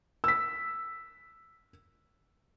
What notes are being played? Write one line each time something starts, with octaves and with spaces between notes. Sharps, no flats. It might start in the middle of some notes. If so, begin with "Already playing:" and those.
E6 B6